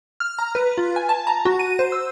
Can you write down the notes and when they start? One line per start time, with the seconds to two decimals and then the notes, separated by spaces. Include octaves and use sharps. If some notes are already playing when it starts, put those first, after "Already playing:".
0.20 F6
0.39 A#5
0.55 B4
0.78 F4
0.96 G#5
1.09 A5
1.27 A#5
1.45 F#4
1.59 D#7
1.79 C5
1.92 E6